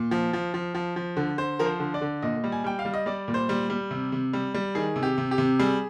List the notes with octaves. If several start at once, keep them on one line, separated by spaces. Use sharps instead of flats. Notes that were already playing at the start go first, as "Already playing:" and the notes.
Already playing: A#2
F3
F3
F3
F3
F3
D3
D3 C5
F3 A#4
C5
D3
D5
D3
A#2 D#5
G3
G#5
G3 G5
F5
G3
D#5
G3 D5
A#2
C5
G3
G3
C3
C3
G3
G3
D#3 G#4
C3
G4
C3
G4
C3
G3 G#4